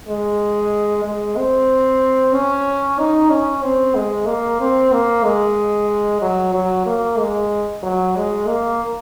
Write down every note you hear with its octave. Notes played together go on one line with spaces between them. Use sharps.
G#3
G#3
C4
C#4
D#4
C#4
C4
G#3
A#3
C4
A#3
G#3
F#3
F#3
A#3
G#3
F#3
G#3
A#3